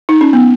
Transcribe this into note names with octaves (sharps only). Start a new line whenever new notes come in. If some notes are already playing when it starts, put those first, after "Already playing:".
D#4
C#4
B3